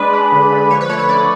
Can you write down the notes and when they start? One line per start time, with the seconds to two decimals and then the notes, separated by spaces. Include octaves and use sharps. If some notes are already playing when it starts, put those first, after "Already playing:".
Already playing: G#3 D4 B4
0.13 D4
0.32 D3
0.52 D3
0.71 F3 C#5
0.81 B4
0.89 A3 C#5
0.99 C#5
1.09 D3 D5